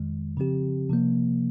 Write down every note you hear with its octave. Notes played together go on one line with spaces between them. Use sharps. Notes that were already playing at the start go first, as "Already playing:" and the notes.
Already playing: F2 D#3 G#3
C#3 F3 C4 G4
C3 F3 A#3